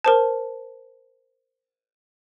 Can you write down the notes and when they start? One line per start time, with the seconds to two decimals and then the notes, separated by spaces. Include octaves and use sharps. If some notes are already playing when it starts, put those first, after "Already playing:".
0.04 A#4 C5 A5